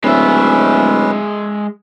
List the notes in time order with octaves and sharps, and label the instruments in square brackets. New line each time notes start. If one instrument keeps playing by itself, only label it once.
[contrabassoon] D1 [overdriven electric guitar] G#3 E5 [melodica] C#4 B4